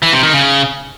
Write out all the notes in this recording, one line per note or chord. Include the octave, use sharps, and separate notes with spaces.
E3
C3
D#3
C#3